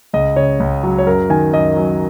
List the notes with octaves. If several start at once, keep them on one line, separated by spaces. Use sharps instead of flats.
C#2 D#5
C#3 C#5
C#2
F#3
C#5
F#2 A#4
D#3 G#5
F#2 D#5
F#3